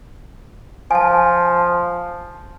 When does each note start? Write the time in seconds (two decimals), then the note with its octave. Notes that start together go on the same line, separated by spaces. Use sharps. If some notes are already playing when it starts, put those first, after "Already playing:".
0.91 F3 G#5 A5